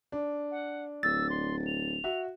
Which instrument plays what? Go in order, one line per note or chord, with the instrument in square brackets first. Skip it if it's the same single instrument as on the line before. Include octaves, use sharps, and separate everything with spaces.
[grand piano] D4
[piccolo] F#5
[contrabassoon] D1 [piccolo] E6 [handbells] A6
[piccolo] C6
F7
[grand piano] F#4 E5